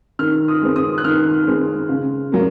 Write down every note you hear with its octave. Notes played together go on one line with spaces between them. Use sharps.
D#3 F6
D#6
G#3 C4
D#6
F#6
D#3 F6
G#3 C4
C#3
F#3 A#3